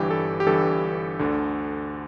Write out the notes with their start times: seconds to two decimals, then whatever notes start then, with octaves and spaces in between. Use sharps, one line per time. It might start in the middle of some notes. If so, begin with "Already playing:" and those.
Already playing: G1 G2 E3 G4
0.10 A4
0.40 G4
0.46 G1 G2 E3 A4
1.19 D2 D3